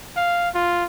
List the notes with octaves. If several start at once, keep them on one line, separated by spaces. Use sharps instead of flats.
F5
F4